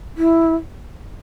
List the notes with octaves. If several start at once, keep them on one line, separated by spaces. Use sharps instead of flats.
E4